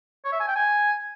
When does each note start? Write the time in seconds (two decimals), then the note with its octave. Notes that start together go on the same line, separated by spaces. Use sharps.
0.24 C#5
0.32 E5
0.40 G#5
0.48 G5
0.56 G#5